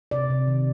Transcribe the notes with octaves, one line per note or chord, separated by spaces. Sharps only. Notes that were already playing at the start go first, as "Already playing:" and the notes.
C3 D5
C3
D#3